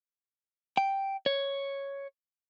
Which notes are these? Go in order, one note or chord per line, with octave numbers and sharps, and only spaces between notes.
G5
C#5